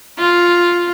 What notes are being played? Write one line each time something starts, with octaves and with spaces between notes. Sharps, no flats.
F4